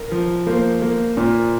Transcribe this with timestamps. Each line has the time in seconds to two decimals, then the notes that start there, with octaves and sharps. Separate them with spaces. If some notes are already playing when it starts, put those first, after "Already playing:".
Already playing: A#4
0.12 F3
0.47 A#3 C5
0.82 A#3
1.17 A#2